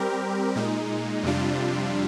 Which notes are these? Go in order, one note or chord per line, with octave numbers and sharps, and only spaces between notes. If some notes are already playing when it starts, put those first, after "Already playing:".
Already playing: G3 C4 G4 A#4
A#2 G#3 D#4
F2 C3 G3 D4 F4